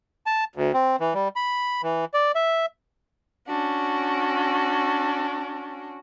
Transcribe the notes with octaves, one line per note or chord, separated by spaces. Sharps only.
A5
D2
C4
E3
G3
B5
E3
D5
E5
C#4 D4 F#4